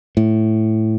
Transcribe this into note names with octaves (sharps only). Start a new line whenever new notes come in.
A2